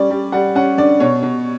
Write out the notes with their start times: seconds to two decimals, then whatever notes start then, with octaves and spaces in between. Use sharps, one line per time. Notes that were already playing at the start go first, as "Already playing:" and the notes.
Already playing: G3 C#4 D5
0.10 G3
0.32 G3 F#5
0.55 C#4 F#5
0.78 D3 D5
1.00 B2 C#5
1.23 B2